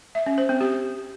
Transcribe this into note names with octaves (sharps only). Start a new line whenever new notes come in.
E5
C#4
C5
C4
G4